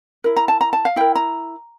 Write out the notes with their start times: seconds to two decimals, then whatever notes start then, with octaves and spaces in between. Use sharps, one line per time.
0.24 E4 A#4
0.37 A#5
0.48 A5
0.61 A#5
0.73 A5
0.85 F5
0.96 E4 A#4 G5
1.15 A#5